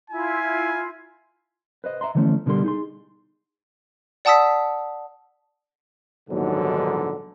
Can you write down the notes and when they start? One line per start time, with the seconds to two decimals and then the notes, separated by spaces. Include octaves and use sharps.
0.10 E4 F4 G#5
1.84 B4 C5 D#5
2.01 E5 A#5 C6
2.15 D3 E3 F3 A3 C#4
2.46 B2 D3 G3 A#4 C6
2.64 D#4 G#4 C6
4.25 D5 F#5 A5 D#6 E6 B6
6.30 A#1 D#2 G#2 B2 D3 F#3